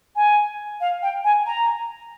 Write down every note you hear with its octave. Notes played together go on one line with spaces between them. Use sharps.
G#5
F5
G5
G#5
A#5